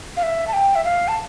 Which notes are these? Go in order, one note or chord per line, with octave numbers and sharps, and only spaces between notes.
F5
E5
A5
G5
E5
F5
A5